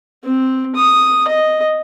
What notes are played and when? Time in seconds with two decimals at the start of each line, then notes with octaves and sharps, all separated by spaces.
0.24 C4
0.76 D#6
1.28 D#5